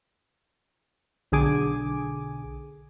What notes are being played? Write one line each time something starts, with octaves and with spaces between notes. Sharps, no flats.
B1 D3 G#4 G#5 D6